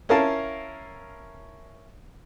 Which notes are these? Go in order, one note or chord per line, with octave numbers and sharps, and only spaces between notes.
C#4 E4 A#4 F5 A5